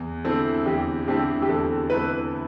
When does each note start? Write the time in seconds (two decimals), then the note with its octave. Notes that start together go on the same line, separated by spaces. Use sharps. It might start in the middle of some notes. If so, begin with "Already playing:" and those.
Already playing: E2
0.24 D3 A3 C4 E4 A4
0.66 E2 G4
1.08 D3 A3 C4 E4 G4
1.42 G4
1.49 E2 A4
1.90 D3 A3 C4 E4 B4